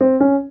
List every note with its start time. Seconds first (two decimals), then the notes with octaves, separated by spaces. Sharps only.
0.01 C4
0.20 C#4